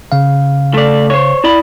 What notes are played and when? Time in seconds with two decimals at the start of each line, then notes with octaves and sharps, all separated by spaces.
0.12 C#3 F5
0.74 A3 D5
1.10 C5 C#5
1.44 E4 D5 B5